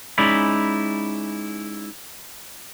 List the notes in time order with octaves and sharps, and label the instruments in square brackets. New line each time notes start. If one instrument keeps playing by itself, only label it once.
[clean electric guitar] G#3 C#4 D#4 E4 D5 B5